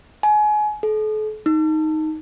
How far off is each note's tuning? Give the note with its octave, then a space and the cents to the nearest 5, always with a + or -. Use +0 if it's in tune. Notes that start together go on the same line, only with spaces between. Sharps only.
G#5 +30
A4 -40
D#4 +5